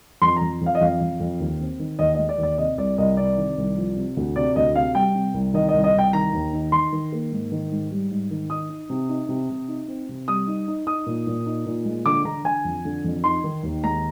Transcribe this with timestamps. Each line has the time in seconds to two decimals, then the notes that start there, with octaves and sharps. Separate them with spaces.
0.22 F2 C6
0.36 F2 A#5
0.61 F2
0.66 F5
0.75 D#5
0.81 F2 F5
1.01 F2
1.20 F2
1.40 D#2
1.60 C4
1.79 D#3
1.99 D#2 D#5
2.15 G#3 D#5
2.29 D5
2.38 D#2
2.43 D5
2.58 C3 D#5
2.78 C2 D5
2.98 C2 D#5
3.17 C3 D5
3.37 D#3
3.58 C2
3.77 F3
3.96 C3
4.17 D2
4.36 C3 D5
4.56 D2 D#5
4.75 C3 F5
4.95 G3 G5
5.15 C3
5.34 C2
5.54 D#3 D#5
5.69 D#5
5.74 C2
5.84 D#5
5.94 C2 G5
6.13 D#3 A#5
6.33 D#2
6.53 D#4
6.72 D#3 C6
6.92 D#3
7.12 A#3
7.32 G#2
7.52 D#3
7.71 G#2
7.91 G3
8.11 G#2
8.31 D#3
8.50 D#4 D#6
8.69 D#4
8.90 C3
9.09 D#4
9.29 C3
9.50 C3
9.68 D#4
9.88 C4
10.09 C3
10.28 G3 D#6
10.47 D#4
10.68 D#4
10.87 D#4 D#6
11.06 A#2
11.27 A#2
11.46 D#4
11.66 A#2
11.85 G#3
12.06 D3 D6
12.25 D3 A#5
12.44 D3 G#5
12.65 F2
12.85 D3
13.04 F2
13.23 D#4 C6
13.44 D#3
13.63 D#2
13.83 G#3 A#5